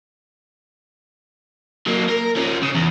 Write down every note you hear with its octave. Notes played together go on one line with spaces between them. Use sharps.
F#3 A#3
A#4
F3 C#4
C#3
E2